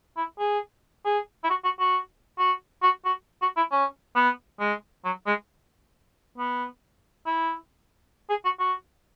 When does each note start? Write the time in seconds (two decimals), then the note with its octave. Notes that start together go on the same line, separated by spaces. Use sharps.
0.17 E4
0.39 G#4
1.05 G#4
1.44 E4
1.50 F#4
1.64 F#4
1.79 F#4
2.39 F#4
2.83 F#4
3.05 F#4
3.42 F#4
3.57 E4
3.72 C#4
4.16 B3
4.60 G#3
5.05 F#3
5.27 G#3
6.38 B3
7.26 E4
8.30 G#4
8.45 F#4
8.59 F#4